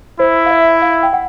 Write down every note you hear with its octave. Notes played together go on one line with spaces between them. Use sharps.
E4 C5
F5
E5
F5
G5
F#5